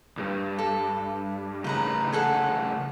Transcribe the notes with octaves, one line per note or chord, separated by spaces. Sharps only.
C2 G2
A4
A2 C#3 D#4 B4 A#5
G#4 A4 F#5